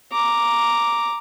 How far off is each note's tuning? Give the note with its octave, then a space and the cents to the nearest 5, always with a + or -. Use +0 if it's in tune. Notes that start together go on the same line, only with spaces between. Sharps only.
A#5 +0 D6 +0